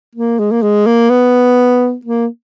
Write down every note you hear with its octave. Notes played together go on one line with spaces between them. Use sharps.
A#3
G#3
A#3
G#3
A#3
B3
A#3